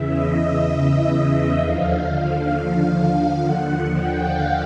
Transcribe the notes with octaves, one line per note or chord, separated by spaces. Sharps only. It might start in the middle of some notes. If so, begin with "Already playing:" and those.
Already playing: E2 C#3 E3 E5
D#5
E5
D#2 D3 F3 F5
D#2 D3 F3 F#5
G5
F5